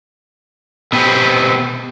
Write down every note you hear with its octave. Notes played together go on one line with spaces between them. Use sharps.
B2 B3 C4 G4